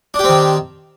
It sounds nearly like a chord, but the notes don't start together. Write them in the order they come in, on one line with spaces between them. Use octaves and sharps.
D4 G4 C4 D#3